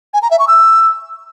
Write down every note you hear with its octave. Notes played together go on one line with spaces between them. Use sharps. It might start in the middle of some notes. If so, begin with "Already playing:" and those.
G#5
A#5
E5
C#6
E6